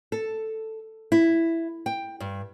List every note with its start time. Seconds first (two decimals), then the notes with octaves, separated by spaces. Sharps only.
0.12 A4
1.12 E4
1.86 G5
2.20 G2